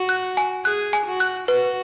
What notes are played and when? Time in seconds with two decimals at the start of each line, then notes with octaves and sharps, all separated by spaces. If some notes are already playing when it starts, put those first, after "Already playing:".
Already playing: F#4
0.09 F#6
0.37 G#5
0.65 G#4 F#6
0.93 G#5
1.07 F#4
1.20 F#6
1.48 F#4 B4